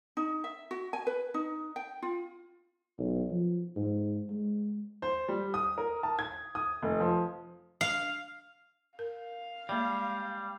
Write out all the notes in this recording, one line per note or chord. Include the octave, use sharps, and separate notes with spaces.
D#4
E5
F#4
G#5
B4
D#4
G5
F4
B1
F3
G#2
G#3
C5
G3
D#6
A#4
A5
G#6
D#6
F1
F3
F5
A#4 F5
G3 G#3 A#3 E5